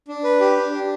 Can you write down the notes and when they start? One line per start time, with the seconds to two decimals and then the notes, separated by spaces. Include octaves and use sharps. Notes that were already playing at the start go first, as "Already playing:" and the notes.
0.08 D4
0.24 B4
0.40 G4
0.57 D4
0.73 D4